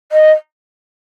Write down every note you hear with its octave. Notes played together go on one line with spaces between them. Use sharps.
D#5